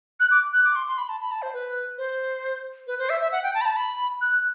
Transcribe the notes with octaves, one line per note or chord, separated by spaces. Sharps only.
F#6
D6
F#6
D6
C6
C6
B5
A5
B5
A5
C5
B4
C5
B4
C5
E5
E5
F#5
G5
A5
B5
A5
B5
F#6